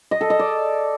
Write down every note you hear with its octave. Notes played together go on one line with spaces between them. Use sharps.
D#5
A4
D#5
D5